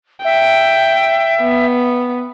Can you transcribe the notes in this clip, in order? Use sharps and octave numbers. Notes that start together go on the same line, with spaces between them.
E5 G5
B3